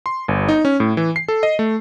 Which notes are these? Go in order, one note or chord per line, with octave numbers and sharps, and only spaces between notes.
C6
G1
D#4
C#4
A2
E3
C7
A4
D#5
A3